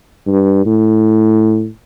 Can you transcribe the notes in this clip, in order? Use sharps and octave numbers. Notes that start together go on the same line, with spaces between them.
G2
A2